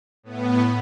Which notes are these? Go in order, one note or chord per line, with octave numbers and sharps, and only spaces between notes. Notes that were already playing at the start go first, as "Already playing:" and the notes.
A2 B3